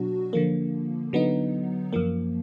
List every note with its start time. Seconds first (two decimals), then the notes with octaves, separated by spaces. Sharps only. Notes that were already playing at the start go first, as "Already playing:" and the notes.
Already playing: B2 F#3 D4 F#4
0.33 D3 F3 A#3
1.13 D3 F#3 B3 D#4
1.93 F#2 F3 A#3